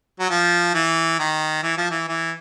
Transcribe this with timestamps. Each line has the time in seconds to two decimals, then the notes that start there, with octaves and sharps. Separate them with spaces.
0.20 F#3
0.30 F3
0.74 E3
1.19 D#3
1.63 E3
1.77 F3
1.91 E3
2.08 E3